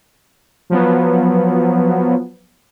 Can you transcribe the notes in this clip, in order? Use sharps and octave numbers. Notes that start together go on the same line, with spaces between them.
F3 F#3 B3